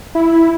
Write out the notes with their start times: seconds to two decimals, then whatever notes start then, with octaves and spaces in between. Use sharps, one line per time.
0.15 E4